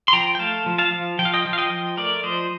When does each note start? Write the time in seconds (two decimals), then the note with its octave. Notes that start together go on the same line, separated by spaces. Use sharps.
0.08 C6
0.13 F3 G5 A#5
0.35 G5
0.39 A3 F5 A5
0.66 F3
0.78 F5 A5
0.92 F3
1.19 F3 G5
1.25 F5
1.34 D#5 G5
1.45 F3
1.53 F5
1.58 D#5 G5
1.71 F3
1.97 A3 A#4 D5
2.23 F3 C5 D#5